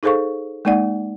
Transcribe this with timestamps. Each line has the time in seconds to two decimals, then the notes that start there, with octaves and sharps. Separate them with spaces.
0.03 D#4 G#4 A4 C5 F5 C#6
0.65 G#3 A#3 D#4 D5 F#5